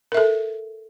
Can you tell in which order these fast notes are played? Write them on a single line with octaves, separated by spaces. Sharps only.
A#4 E5 A4